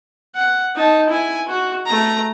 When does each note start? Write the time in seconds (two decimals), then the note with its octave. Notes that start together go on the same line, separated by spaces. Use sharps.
0.35 F#5
0.75 D#4 A5
1.10 E4 G#5
1.48 F#4
1.86 A3 A#5